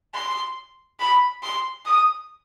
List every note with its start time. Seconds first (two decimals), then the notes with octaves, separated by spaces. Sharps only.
0.14 C6
1.00 B5
1.43 C6
1.85 D#6